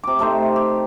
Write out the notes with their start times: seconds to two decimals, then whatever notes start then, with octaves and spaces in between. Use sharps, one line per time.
0.04 C3 D6
0.19 C3 A3 D#4 C5
0.56 G4